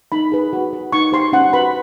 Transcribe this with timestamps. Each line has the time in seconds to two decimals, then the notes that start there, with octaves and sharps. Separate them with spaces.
0.12 D#4 B5
0.32 G#4 B4
0.53 F#4
0.73 B4
0.93 D#4 C#6
1.12 G4 C5 C6
1.33 C#4 F#5
1.53 F#4 B4 B5